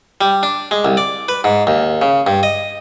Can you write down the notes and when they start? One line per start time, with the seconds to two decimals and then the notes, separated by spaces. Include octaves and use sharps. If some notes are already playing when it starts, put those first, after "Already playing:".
0.21 G3
0.43 D4
0.71 G#3
0.85 C2
0.97 D5
1.29 B4
1.44 G#2
1.67 D#2
2.02 C#3
2.27 G2
2.43 D#5